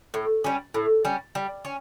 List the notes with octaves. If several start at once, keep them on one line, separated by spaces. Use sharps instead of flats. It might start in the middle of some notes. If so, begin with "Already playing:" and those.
A2
G3 C#4
A2
G3 C#4
G3
C#4